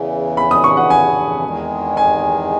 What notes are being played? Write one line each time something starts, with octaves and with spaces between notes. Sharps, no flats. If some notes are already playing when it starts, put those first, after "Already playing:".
Already playing: E2 C#3 E3
B5
D#6
C#6
F#5
G#5
E2 D#3 G#3
G#5